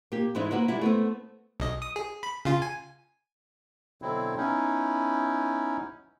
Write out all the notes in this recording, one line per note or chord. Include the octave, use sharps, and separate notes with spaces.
A#3 G4
G#2 E3 G#3 C4 D#4 E4
A#3 C4 F#4 B4
G3 G#3 E4
A3 B3 C4
B1 D#5
D#6
G#4
B5
C#3 F4
G#5
B2 D3 F#3 C4 E4
B3 C#4 D#4 E4